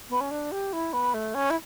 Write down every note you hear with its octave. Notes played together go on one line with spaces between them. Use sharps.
B3
C#4
D4
G4
E4
B3
A3
C#4
E4